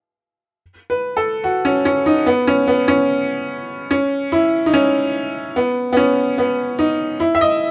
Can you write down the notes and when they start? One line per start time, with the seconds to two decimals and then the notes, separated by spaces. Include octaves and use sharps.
0.90 B4
1.17 A4
1.44 F#4
1.65 C#4
1.85 C#4
2.06 D#4
2.26 B3
2.47 C#4
2.67 B3
2.88 C#4
3.91 C#4
4.32 E4
4.66 D#4
4.74 C#4
5.56 B3
5.93 B3
5.97 C#4
6.38 B3
6.79 D#4
7.20 E4
7.35 E5
7.41 D#5